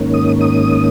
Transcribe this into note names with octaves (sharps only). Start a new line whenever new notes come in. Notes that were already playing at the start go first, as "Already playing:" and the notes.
Already playing: G#2 D#3 A#3 C#4
D#6
D#6